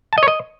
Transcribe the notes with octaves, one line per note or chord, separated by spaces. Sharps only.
A5
D#5
C#5
D#5